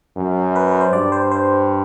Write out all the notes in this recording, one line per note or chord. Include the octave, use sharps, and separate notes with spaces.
F#2
B4
B4
C5
G2 D5
C5
C5